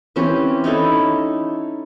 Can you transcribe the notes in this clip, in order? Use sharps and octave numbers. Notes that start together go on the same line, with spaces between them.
E3 C4 C#4 G4
C#4 D#4 E4 A4